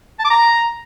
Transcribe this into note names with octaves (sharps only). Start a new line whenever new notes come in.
A5
D6
A#5